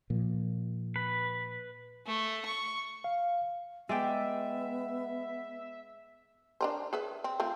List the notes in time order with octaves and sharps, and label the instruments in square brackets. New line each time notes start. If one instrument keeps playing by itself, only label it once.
[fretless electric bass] A#2 F3
[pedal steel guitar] B4
[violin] A3
C#6
[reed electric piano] F5
[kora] G#3 D5 G5 [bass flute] B3 [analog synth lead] E5
[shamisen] D4 A#4 C5
G#4 B4 E5
C4
A3 C4 F4